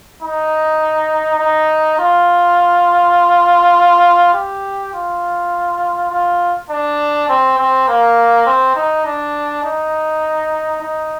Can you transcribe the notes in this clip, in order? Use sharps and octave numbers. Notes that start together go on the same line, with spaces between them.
D#4
D#4
F4
G4
F4
F4
D4
C4
C4
A#3
C4
D#4
D4
D#4
D#4